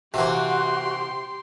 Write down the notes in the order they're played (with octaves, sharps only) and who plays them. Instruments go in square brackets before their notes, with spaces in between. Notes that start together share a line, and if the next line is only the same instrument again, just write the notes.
[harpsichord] C3 E3 [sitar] A#3 C4 [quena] F#4 [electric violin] G4 C6